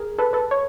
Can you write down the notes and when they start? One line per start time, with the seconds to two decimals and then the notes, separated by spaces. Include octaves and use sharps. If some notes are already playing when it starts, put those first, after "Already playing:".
Already playing: G#4 A#4
0.18 A4 B4
0.33 A4 B4
0.51 C#5